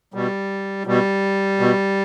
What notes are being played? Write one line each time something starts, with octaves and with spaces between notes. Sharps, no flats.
B2 G3
B2 G3
B2